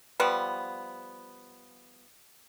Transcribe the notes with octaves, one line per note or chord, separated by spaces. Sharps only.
F3 G3 B3